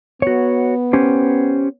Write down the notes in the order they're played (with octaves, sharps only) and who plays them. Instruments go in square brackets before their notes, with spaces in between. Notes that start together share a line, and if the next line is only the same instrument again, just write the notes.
[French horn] B3 [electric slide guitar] F#4 C#5
[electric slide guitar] C#4 G4 C5